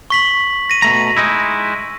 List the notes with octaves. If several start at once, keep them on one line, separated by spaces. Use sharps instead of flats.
C#6 B6 F#7
A#6 D#7
B2 A3 A#5
G#3 D#4 E4